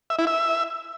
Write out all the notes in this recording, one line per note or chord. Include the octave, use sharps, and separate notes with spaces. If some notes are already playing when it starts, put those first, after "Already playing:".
E5
E4
E5